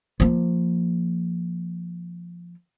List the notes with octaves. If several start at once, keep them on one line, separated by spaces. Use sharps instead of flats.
F3 A#3